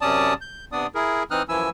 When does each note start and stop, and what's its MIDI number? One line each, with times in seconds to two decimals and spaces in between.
0.01 0.34 42
0.01 0.34 48
0.01 0.34 61
0.01 0.34 74
0.01 0.34 81
0.01 0.34 87
0.41 0.65 91
0.72 0.87 48
0.72 0.87 59
0.72 0.87 62
0.72 0.87 74
0.72 0.87 87
0.95 1.23 64
0.95 1.23 68
0.95 1.23 70
1.31 1.43 52
1.31 1.43 60
1.31 1.43 63
1.31 1.43 87
1.31 1.43 89
1.31 1.43 90
1.49 1.70 42
1.49 1.70 52
1.49 1.70 53
1.49 1.70 64
1.49 1.70 80
1.49 1.70 88